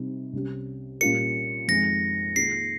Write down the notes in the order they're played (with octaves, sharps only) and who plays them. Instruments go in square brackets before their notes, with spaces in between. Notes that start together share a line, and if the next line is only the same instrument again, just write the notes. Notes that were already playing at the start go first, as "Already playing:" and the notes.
Already playing: [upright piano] C3 G3 C4 D#4
C2 C3 G3 C#4 G4
[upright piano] A#2 G3 C#4 F4 A#4 [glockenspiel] C#7
[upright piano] F2 D#3 G#3 [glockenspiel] A#6
[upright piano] D#3 A#3 F4 G#4 [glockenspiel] C7